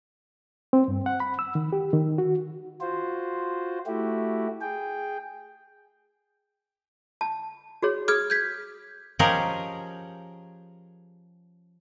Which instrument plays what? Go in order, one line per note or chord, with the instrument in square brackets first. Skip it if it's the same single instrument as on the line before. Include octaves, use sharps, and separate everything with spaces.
[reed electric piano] C4
G2
F#5
B5
E6
D#3
G4
D#3
F#4
[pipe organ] F4 F#4 C5
A3 E4 F#4 G4
G#4 G5
[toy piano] A5
F#4 G#4 C#5
[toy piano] G#4 D#6 [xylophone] F6 G#6
[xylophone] G6 G#6 B6
[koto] F3 C#4 G4 G#4 A#4 D#5